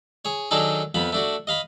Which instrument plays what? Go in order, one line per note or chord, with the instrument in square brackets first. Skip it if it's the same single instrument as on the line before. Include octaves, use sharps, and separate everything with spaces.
[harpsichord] G#4 C#5
D#3 F#3 D4 D#4 G#4 A4
F2 F3 B3 B5
A3 D4 F#4
D#5 F5 B5